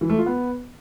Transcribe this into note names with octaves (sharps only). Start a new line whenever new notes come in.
E3
A3
F4
B3